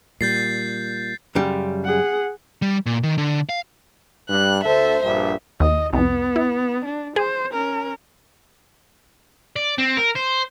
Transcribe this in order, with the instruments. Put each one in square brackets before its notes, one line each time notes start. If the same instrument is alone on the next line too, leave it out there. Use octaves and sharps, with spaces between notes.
[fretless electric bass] A#2 G3 [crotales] G6 A6 C7
[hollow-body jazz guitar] F#2 C#3 G3
[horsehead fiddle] G#4 F#5
[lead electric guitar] G3
A#2
D#3
D3
F5
[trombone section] G2 [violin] F#6
[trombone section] D2 A4 [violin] C5 E5
[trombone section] A#1 G2 [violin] E5
[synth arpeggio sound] D#2 [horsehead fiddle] D#5
[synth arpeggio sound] C2 F2 [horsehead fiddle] B3
[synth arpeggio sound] E4
[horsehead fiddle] D4
[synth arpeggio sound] G#4 [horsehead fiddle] C5
[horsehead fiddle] C#4 A#4
[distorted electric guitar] D5
C4
A#4
C5